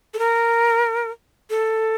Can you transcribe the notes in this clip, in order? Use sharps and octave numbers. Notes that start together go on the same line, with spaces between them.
A4
A#4
A4